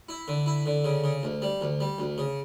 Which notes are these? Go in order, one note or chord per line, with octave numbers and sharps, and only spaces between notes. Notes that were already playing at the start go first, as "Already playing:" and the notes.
E4
D3
E4
D3
C#3
C#3
D2
G3
D2
G3
D2
C#3